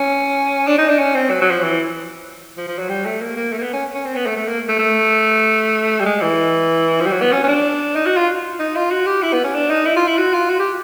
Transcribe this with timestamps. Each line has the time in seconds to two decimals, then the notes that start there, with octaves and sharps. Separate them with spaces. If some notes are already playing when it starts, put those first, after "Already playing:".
Already playing: C#4
0.67 D4
0.78 D#4
0.88 D4
0.99 C#4
1.15 C4
1.30 F#3
1.41 F#3
1.51 F3
1.63 E3
2.57 F3
2.67 F3
2.78 F#3
2.89 G3
3.05 A3
3.21 A#3
3.36 A#3
3.52 A3
3.58 A#3
3.62 B3
3.73 C#4
3.94 C#4
4.05 C4
4.16 B3
4.26 A3
4.36 A3
4.48 A#3
4.68 A3
4.79 A3
6.00 G3
6.05 G#3
6.21 E3
7.00 F3
7.06 G3
7.11 F#3
7.22 B3
7.32 C#4
7.44 C#4
7.48 D4
7.95 D#4
8.06 F#4
8.17 F4
8.59 D#4
8.75 F4
8.91 F#4
9.06 G4
9.22 E4
9.33 B3
9.44 C#4
9.54 D4
9.70 D#4
9.86 E4
9.96 F4
10.07 E4
10.17 F#4
10.33 F4
10.49 F#4
10.59 G4